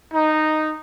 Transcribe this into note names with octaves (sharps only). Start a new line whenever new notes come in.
D#4